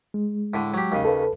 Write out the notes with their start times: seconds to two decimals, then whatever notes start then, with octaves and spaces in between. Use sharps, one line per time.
0.14 G#3
0.54 A2 D3
0.74 F#3 G4
0.92 D#2 C#3
1.05 A4 B4